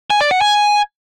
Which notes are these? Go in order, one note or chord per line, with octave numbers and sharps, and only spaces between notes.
G#5
D5
F#5
G#5